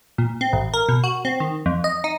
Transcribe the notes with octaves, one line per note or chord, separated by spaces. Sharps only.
A#2
C4
A1
A#4
B2
F#4
C4
D#3
F2
D#5
D#4